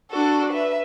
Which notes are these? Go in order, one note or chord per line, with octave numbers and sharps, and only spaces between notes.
D4 F#4 A4
B4 E5